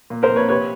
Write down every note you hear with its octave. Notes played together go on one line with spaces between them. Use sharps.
A#2
A#4 C5
A#1
B4 C#5
C3 B4 C#5